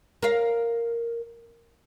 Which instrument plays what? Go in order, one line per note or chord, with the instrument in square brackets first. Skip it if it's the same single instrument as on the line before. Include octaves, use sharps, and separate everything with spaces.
[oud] A#4 F5